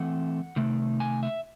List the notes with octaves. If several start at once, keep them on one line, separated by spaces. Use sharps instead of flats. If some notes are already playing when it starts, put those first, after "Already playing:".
Already playing: E3 A3 C4 F#5
C3 D#3 A3
G#5
E5